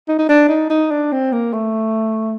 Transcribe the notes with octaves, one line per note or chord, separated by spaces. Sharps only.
D#4
D#4
D4
D#4
D#4
D4
C4
A#3
A3